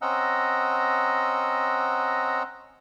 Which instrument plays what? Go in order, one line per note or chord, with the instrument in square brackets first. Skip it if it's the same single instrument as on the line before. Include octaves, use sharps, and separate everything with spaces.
[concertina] C4 C#4 D#5 F#5 A#5 E6